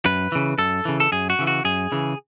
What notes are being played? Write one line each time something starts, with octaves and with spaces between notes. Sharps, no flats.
F#2 B4
C#3 E3
F#2 A4
C#3 E3
A4
F#2 G#4
F#4
C#3 E3
F#4
F#2 G#4
C#3 E3